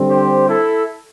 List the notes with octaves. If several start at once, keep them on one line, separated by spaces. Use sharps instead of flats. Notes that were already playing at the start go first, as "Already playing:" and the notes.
Already playing: D3 G3 C4
G4 C5
E4 A4